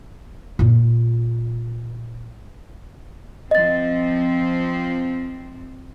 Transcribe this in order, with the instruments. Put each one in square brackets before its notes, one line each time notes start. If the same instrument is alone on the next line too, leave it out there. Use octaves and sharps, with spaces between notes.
[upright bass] A#2 F4
[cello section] F3 C4 [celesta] D#5 A6